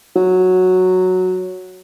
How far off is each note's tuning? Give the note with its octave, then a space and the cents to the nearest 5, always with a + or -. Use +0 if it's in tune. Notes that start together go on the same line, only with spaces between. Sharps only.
F#3 -5